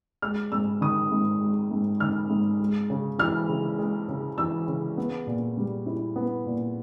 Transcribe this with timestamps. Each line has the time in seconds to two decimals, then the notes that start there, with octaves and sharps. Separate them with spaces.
0.22 G#3 F6
0.52 G#2 E6
0.81 D#3 D#6
1.12 G#2
1.41 G#3
1.71 G#2
2.00 D#3 F6
2.30 G#2
2.60 G#3
2.90 C#3
3.19 E3 F6
3.49 C#3
3.79 G#3
4.08 C#3
4.38 E3 E6
4.67 C#3
4.97 B3
5.27 A#2
5.57 G3
5.86 E4
6.16 B3
6.46 A#2